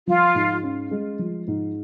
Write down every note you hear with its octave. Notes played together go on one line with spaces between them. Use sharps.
F3 F4
G#2
C#4
G#3
F3
G#2